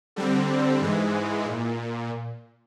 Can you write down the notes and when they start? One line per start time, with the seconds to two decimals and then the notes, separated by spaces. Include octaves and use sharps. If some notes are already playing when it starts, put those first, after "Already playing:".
0.16 D3 G3 C4
0.81 G#2 E3 G#3
1.46 A#2